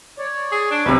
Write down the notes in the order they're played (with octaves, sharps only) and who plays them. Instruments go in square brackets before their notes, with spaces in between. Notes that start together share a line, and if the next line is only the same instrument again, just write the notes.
[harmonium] C#5 D5
[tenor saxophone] G#4
D4
[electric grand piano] B1 C3 [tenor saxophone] B4